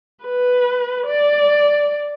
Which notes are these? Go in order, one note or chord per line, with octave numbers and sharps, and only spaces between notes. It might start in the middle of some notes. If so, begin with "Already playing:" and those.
B4
D5